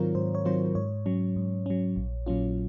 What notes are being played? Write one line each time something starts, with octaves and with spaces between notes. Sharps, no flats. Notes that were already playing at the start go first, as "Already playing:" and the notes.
Already playing: G#2 D#3 F#3 C4 F4 A#4 C#5
G#2 C5
C#5
D#3 F#3 C4 F4 C5
G#2 C#5
F#3 C#4
G#2
F#3 C#4
A#1
A#2 F#3 C#4 F4